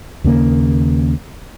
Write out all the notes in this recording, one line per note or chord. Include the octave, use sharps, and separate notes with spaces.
D#2 C#3 A#3